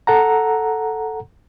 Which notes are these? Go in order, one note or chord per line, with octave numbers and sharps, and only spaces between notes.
A4 F#5 A#5